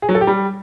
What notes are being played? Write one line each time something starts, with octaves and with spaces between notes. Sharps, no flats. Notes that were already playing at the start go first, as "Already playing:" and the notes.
G#4
F#3
A4
G4
G3